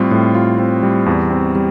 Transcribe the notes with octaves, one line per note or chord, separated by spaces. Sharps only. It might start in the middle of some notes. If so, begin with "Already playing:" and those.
Already playing: A2 G3 C4 F4
A2
F4
C4
G3
E2
C4
G3